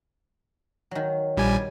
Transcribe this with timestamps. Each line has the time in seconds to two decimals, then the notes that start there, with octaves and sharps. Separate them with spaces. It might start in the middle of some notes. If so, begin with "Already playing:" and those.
0.91 D#3 F#3
1.37 A#1 G3 G#5